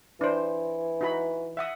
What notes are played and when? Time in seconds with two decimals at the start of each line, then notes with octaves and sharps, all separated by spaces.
0.21 E3 D4 C5
1.01 D#4 F#4 B5
1.57 E5 F#5 D#6